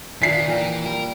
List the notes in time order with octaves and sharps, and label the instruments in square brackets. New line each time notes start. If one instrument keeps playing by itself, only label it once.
[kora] A#2 D4 [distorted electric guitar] D#3 [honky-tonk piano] B6 C7
[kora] A#2 A#4 G5 [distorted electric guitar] E3
[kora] G3 [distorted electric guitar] A#4